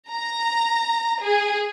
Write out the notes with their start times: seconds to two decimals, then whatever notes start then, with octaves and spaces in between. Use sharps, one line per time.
0.11 A#5
1.21 G#4